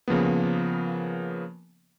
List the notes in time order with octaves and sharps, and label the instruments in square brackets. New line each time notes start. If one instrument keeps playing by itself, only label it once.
[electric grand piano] C#3 F3 A#3 B3